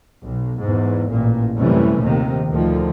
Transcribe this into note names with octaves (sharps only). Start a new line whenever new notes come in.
B1
E2 G#2
A1 A#2
F#2 C3 E3 G3 A3 C#4
A#1 D#2 C3 D#3
D2 D#3 F3